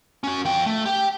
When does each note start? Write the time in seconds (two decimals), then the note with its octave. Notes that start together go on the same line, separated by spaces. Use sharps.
0.24 C#4 F#4
0.45 F3 G5
0.66 A3
0.86 G4 G5